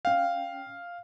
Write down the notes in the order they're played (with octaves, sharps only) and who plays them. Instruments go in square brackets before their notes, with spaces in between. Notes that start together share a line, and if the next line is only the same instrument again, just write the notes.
[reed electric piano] C#4 G5 [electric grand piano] F5